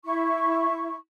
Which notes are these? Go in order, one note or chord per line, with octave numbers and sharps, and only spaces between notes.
E4 C#6